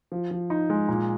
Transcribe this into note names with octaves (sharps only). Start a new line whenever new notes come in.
F3
F3
D#4
G#3
A#2